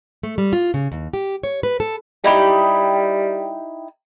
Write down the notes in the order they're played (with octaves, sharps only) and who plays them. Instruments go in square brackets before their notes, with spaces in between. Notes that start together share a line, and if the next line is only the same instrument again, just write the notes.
[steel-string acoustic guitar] A3
G3
F4
C#3
D#2
G4
C#5
B4
A4
[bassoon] G3 [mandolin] D#4 E4 G4